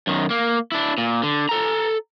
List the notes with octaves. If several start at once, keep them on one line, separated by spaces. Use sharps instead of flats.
F#2 D#3
A#3
D4 E4
A#2
D3
A4 A#5